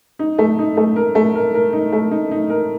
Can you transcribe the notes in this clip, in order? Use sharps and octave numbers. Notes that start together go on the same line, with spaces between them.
D#4
A3
D#4
A3
A#4
A3
A#4
A#4
D#4
A3
D#4
D#4
A#4